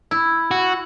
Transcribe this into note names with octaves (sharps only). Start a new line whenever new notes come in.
E4
F#4